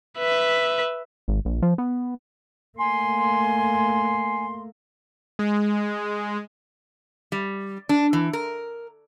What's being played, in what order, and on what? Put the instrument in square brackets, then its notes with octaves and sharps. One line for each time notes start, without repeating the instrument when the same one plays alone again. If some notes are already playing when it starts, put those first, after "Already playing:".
[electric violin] B4 E5
[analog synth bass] G#1
A#1
F3
B3
[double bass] A3 A#3 [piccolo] G#5 [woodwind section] C6
[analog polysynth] G#3
[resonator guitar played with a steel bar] G3
D4
E3
A#4